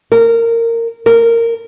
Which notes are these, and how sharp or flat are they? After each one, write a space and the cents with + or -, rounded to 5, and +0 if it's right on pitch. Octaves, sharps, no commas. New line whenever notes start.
A#4 -20
A#4 -15